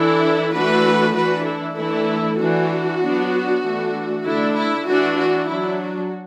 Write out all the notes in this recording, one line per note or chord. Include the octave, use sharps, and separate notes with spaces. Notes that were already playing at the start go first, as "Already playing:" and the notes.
Already playing: E3 D4 E4 A4
E3 A3 D4 F#4 B4
E3 D4 F#4 B4
E4 A4
E3 A3 D4 E4 A4
E3 D4 F#4
F#3 B3 D4
E3 A3 D4
D3 A3 D4 E4
E4
E3 D4 F#4
F#4
F#3 D4 E4
F#4